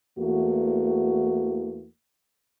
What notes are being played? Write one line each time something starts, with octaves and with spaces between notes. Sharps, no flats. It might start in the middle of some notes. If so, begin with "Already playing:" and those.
E2 E3 A3 A#3 F#4